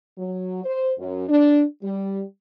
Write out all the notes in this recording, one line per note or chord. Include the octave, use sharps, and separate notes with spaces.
F#3
C5
F#2
D4
G3